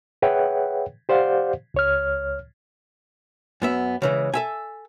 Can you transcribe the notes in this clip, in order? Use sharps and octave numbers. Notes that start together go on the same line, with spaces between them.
G#4 B4 C#5 E5 F#5 G5
G4 C5 D5 F5 F#5
C#2 C#5 F6
F#2 B3 E5
C#3 E3 G#3
A4 E5 G#5